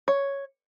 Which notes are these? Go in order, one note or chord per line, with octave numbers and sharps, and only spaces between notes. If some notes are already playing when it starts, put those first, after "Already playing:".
C#5